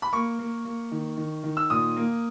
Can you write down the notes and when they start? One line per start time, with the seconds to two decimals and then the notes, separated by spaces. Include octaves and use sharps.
0.02 B5
0.13 A#3 C#6
0.39 A#3
0.65 A#3
0.92 D#3
1.17 D#3
1.44 D#3
1.57 E6
1.70 A#2 D#6
1.96 A#3